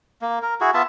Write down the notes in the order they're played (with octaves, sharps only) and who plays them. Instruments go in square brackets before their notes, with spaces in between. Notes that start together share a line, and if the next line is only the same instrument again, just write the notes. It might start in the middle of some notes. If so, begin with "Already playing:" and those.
[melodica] A#3
A#4
E4 F#4 G#4
B3 F4 E5 A5